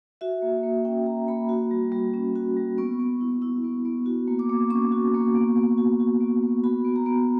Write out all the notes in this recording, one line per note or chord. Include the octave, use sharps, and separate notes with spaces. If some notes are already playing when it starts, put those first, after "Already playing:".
F#4 E5
A#3
A#3
C#4 G5
F#4 A#5
A#3 B5
F#4
G3
G3
C#4
F#4
G3
B3 C#6
B3
E4
E4
B3
B3
F#4
A#3
D6
A#3
C#4 C#6
F#4
A#3
B3
B3
F#4
F#4
B3
B3
F#4 B5
B3
A#5
B3